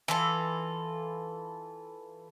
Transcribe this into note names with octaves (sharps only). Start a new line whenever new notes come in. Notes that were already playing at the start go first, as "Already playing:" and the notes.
E3 F4 A4